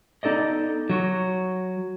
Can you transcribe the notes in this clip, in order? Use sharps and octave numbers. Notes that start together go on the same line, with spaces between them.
B3 D#4 A4 D5 D#5
F#3 F#4